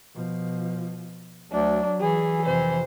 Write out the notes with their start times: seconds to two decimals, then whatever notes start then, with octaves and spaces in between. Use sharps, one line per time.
0.15 B2 F3
1.52 D2 F#3 D4
2.00 E3 G#4
2.46 F2 C3 C5